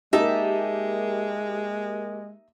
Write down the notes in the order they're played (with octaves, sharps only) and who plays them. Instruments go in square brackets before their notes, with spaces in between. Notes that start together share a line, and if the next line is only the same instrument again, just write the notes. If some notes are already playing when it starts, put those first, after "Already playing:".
[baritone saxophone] G#3 [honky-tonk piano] A#3 G4 [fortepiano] D#4 [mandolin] E5 A5